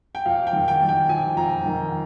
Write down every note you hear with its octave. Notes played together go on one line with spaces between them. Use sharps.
G5
F2 F5
G5
D#3
G5
D#3
G5
F2 G#5
F2 A#5
D#3